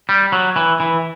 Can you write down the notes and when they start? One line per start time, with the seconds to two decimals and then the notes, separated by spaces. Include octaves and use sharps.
0.09 G3
0.32 F#3
0.56 E3
0.80 E3